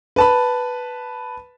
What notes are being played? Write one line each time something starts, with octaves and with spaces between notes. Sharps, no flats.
B4 A5 B5